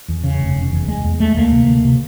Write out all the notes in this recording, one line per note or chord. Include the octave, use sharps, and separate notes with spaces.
E2
C#3
F1
F1
E2
E2 G#3
E2
D2 A3
D2 A#3
C3
D2
C3